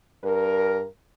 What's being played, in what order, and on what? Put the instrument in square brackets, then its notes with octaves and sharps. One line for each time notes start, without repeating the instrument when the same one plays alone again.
[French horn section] G2 A#4